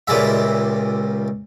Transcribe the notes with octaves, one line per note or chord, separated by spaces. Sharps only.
C#2 A#2 G3 G#3 E5